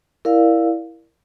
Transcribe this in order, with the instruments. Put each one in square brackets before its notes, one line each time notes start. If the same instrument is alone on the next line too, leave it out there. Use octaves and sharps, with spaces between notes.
[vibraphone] E4 A#4 D5 F5